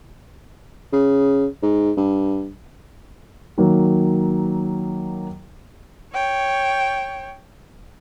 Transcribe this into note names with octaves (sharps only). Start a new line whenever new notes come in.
C#3
G#2
G2
D#3 F#3 A#3
C#5 G5